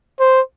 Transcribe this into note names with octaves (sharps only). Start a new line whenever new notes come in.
C5